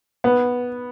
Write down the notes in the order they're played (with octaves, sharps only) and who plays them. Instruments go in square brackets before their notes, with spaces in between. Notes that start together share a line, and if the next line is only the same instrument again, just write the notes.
[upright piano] B3